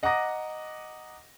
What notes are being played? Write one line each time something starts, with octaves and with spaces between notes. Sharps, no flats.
D#5 F#5 A#5 D6 D#6 A#6